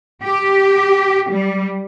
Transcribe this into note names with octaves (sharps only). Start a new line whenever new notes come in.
G4
G3